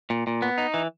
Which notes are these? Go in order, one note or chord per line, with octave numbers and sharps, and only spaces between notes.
A#2
A#2
B3
D#4
E3